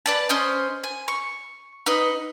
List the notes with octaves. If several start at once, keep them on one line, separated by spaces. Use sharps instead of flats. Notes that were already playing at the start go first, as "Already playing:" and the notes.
B4 D5 A5
C#4 C5 D#5
G#5
C#6
D#4 B4 D#5